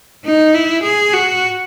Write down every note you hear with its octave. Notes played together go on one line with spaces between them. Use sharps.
D#4
E4
G#4
F#4